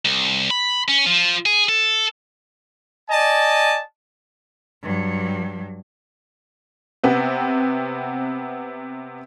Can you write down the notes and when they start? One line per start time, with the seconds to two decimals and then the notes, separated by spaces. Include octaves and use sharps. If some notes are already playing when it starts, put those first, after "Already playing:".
0.05 C2
0.51 B5
0.88 C#4
1.06 F3
1.46 G#4
1.69 A4
3.09 D5 D#5 G#5 A5
4.83 G2 F#3
7.03 C3 B3 C4